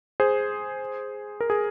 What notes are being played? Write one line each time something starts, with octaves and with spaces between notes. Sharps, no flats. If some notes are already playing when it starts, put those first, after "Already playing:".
G#4 C5
A#4
G#4